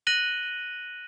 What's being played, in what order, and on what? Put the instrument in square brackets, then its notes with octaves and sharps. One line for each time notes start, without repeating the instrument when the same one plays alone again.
[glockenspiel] F#6 A#6 D#7 F#7 G7